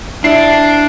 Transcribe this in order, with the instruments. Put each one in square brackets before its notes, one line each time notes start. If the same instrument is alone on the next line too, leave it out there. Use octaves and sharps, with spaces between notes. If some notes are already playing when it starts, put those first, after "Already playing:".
[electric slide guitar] D4 [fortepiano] E4 [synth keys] C7